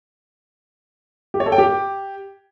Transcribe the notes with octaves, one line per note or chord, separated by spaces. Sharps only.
G4
C#5
A4
G5
G4